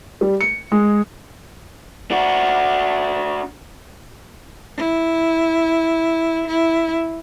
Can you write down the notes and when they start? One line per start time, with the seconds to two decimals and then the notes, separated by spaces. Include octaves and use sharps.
0.21 G3
0.41 C#7
0.72 G#3
2.11 D4 F#4
4.78 E4
6.48 E4